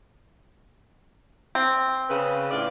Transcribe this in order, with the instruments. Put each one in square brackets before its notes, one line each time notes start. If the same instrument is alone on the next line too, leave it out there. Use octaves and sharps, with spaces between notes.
[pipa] C4
[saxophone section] C#3 B4
A2 F4 D5